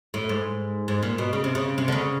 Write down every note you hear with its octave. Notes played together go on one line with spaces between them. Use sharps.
A2
G#2
G#2
A#2
B2
C#3
C3
C#3
C3
D3
C#3